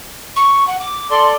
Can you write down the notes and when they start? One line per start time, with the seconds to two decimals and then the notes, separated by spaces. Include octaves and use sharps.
0.36 C#6
0.68 F#5
0.80 D6
1.11 A4 D5 C6